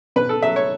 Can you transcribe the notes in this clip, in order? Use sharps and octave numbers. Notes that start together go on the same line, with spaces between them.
B2 B4
A4
F#3 E5
C#5